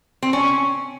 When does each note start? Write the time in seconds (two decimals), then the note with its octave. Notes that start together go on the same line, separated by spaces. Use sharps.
0.23 C4
0.33 C#4